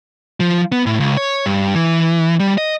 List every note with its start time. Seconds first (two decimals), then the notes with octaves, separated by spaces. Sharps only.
0.40 F3
0.72 B3
0.86 A2
1.00 C#2
1.17 C#5
1.46 G2
1.75 E3
2.40 G3
2.58 D#5